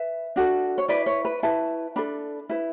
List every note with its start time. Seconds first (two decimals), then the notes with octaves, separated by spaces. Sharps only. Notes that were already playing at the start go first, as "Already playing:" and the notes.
Already playing: B4 E5
0.36 D4 F#4 A4
0.78 C#5
0.88 E4 B4 D5
1.06 C#5
1.25 B4
1.43 E4 B4 A5
1.96 D4 A4 B5
2.49 E4 B4